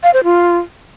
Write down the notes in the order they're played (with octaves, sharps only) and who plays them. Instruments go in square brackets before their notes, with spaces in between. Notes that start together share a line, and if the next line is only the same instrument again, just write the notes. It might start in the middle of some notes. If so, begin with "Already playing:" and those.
[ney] F5
C5
F4